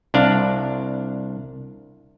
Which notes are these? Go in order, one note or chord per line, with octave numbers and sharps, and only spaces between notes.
C2 D4 F5